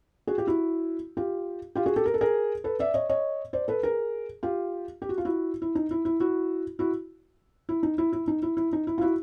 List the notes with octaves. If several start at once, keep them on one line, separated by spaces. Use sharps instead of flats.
F#4 G#4
F4 G4
E4 F#4
F4 G4
F4 G4
F#4 G#4
G4 A4
A#4
A4
G#4 A#4
A4 B4
D5 E5
C#5 D#5
C#5 D#5
C5 D5
A4 B4
G#4 A#4
F4 G4
G4
F#4
F4
E4 F#4
E4
D#4
E4
E4
E4 F#4
E4 F#4
E4
D#4
E4
E4
D#4
E4
E4
D#4
E4
F4
E4 F#4